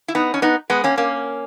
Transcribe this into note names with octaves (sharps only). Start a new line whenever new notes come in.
E4
B3 D#4
C#4
B3 D#4
G#3 B3
A#3 C#4
A#3 C#4